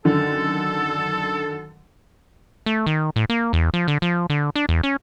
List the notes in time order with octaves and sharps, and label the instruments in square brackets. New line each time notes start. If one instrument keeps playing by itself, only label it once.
[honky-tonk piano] F#2 D3 D#3 [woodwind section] A4
[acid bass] A3
D#3
A2
A#3
E2
F3
D3
F3
D3
D4
E2
C#4